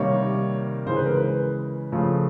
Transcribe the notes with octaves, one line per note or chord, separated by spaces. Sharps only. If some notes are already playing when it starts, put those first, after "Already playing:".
Already playing: C3 D#3 G3 A#3 C#5
C#3 E3 G#3 C5
B4
A#4
B4
C#3 F3 A3